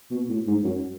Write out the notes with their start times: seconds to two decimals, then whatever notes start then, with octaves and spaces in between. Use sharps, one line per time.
0.11 B2
0.29 A2
0.47 G#2
0.64 F#2